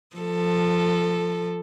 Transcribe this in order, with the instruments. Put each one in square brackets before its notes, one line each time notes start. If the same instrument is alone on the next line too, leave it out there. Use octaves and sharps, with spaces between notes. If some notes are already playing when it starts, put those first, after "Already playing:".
[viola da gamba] F3 A4